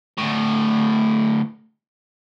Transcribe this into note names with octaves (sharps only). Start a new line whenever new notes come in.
D2 A2